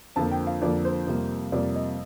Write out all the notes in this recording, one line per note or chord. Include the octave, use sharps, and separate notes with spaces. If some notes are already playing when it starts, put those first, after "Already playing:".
F2 D3 F3 A#3 A5
G5
F5
F2 D3 F3 A#3 D5
C5
F2 C3 G3 A#3
F2 C3 G3 A#3 D5
D#5